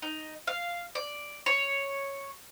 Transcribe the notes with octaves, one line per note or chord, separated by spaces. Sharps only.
D#4
F5
D5
C#5